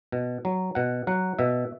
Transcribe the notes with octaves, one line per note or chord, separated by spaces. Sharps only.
B2
F#3
B2 F#5
F#3 F#5
B2 E5